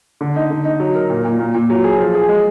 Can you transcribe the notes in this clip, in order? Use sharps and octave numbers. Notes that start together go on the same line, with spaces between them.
D3
D#4
D3
D#4
F#3
A#4
A#2
A#2
A#2
A#2
F#3
G#4
F3
G#4
G#3